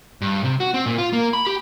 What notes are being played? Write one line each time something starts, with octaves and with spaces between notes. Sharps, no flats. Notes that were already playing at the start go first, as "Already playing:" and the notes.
G2
C3
F#4
C4
A#2
F4
A#3
B5
G4